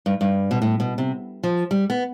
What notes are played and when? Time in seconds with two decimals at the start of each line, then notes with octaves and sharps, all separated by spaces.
0.06 G2
0.21 G2
0.51 B2
0.62 A2
0.80 B2
0.98 C3
1.43 F3
1.71 G3
1.90 B3